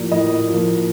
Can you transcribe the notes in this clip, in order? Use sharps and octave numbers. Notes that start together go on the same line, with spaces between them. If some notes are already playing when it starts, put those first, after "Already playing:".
Already playing: A2 F3 A#3 D5
A2 D#5
F3 A#3